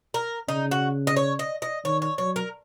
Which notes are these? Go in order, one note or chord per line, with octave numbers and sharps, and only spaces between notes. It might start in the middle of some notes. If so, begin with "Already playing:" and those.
A#4
C#3 D#4
F#4
D#5
C#5
D#5
D#5
D#3 C#5
C#5
F#3 C#5
A#4